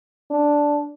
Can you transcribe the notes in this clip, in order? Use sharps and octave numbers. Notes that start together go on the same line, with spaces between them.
D4